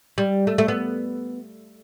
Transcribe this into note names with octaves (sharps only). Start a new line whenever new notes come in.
G3
A3
A3
B3